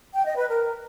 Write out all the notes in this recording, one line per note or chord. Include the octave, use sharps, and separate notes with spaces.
G5
D#5
B4
A#4